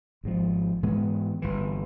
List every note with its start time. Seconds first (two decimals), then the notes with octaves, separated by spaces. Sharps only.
0.24 G#1 G#2 F3
0.83 G#2 E3 G#3 B3
1.42 G1 G2 E3